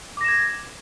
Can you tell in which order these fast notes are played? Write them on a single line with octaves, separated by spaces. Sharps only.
D6 A#6 E7 G#6